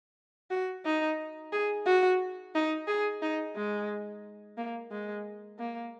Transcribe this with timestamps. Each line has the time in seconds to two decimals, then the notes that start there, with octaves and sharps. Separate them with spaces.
0.50 F#4
0.85 D#4
1.53 G#4
1.86 F#4
2.55 D#4
2.87 G#4
3.22 D#4
3.56 G#3
4.57 A#3
4.91 G#3
5.59 A#3